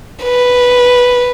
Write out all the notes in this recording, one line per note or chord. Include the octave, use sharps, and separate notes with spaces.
B4